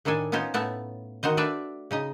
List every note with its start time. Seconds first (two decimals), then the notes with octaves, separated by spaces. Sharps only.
0.05 A2 D#3 D4 A4 G#5
0.32 B3 C#4 D#4 F4 C5
0.54 A2 A3 B3 A5
1.23 D#3 F#4 C5 D#5
1.37 A3 D4 B4 D5 E5
1.91 C#3 D#4 D#5